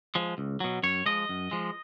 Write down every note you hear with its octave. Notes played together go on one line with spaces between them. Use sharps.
F3 G#3
C#2
B2 F#3
F#2 C#5
F3 G#3 D#5
F#2
F3 G#3